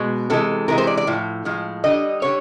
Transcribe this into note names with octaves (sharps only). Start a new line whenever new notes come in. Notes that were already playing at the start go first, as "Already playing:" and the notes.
Already playing: B2 G#3
C3 E3 G#3 A4
C3 E3 G#3 A#4
C5
D5
D5
A2 F3
A2 F3 G#3
D3 G3 D#5
D3 G3 C#5